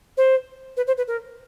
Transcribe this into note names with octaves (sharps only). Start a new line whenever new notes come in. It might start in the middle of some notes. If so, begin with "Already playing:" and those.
C5
B4
C5
B4
A#4